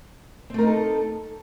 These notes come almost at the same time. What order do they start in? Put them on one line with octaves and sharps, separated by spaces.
C4 A3 A#4 D#4 A4